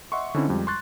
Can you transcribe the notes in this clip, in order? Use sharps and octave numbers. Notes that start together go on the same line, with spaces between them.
D#5 E5 F#5 C6 C#6
D3 C4 C#4 D#4 E4 C5
F2 G3 G#3
C6 C#6 F#6 A6